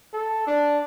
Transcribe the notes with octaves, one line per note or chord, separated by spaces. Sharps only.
A4
D4